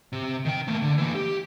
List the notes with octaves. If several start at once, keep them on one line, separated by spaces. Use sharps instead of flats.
C3
D#3 G5
A3 A#3
D3
E3 A#3
G4